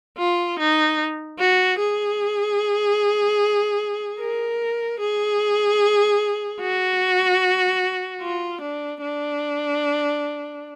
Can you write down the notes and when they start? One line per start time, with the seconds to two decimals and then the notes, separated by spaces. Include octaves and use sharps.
0.18 F4
0.59 D#4
1.39 F#4
1.79 G#4
4.20 A#4
5.00 G#4
6.61 F#4
8.22 F4
8.61 D4
9.02 D4